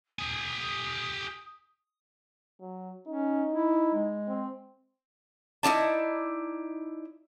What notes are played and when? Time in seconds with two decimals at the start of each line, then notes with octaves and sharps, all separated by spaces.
0.19 G4 G#5 D#6
2.61 F#3
3.08 C#4 D#4
3.53 E4
3.94 G#3
4.28 C4
5.63 D#4 E4 D5 A5